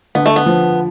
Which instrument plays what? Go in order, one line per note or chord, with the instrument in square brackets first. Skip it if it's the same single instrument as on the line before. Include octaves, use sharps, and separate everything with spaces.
[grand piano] D3 [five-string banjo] B3
[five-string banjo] A3
B3
[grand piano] F3